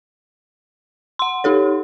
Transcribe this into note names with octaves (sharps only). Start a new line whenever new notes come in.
F#5 C6
D#4 G4 A4 C#5